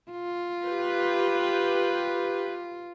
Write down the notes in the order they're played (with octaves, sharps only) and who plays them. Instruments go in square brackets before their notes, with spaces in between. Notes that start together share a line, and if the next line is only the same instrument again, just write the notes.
[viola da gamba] F4
[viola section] G4 B4